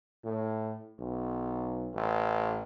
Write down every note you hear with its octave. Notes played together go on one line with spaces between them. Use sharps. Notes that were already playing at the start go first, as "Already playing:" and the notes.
A2
B1
A1